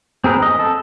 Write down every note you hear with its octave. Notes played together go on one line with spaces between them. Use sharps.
C4 G#4 A#4 B4
D#5
A4